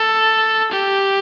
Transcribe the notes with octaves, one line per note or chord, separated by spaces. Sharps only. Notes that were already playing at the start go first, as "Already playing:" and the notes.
Already playing: A4
G4